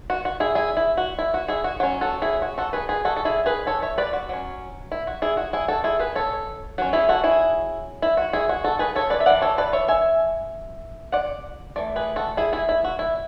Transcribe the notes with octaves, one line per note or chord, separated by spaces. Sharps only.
F#4
F#4
E4 G#4
E4 G#4
E4
F#4
E4
F#4
E4 G#4
F#4
F#3 C#4 F#4
F#4 A4
E4 G#4
F#4
F#4 A4
G#4 B4
G#4 B4
F#4 A4
A4
E4 G#4
G#4 B4
A4 C#5
C#5 E5
B4 D5
F#4
F#3 C#4
E4
F#4
E4 G#4
F#4
E4 G#4
F#4 A4
E4 G#4
G#4 B4
A4 C#5
F#3 C#4 F#4
E4 G#4
F#4 A4
E4 G#4
E4
F#4
E4 G#4
F#4
F#4 A4
G#4 B4
A4 C#5
B4 D5
E5
E3 B3 D4 D5 F#5
A4 C#5
B4 D5
C#5 E5
E5 G#5
D5 F#5
E3 A3 D5
G#4 B4
F#4 A4
E4 G#4
E4 G#4
E4
F#4
E4